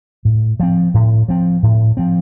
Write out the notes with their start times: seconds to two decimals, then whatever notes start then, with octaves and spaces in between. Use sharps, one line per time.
0.25 A2
0.60 F3 C4
0.94 A2
1.29 F3 C4
1.63 A2
1.97 F3 C4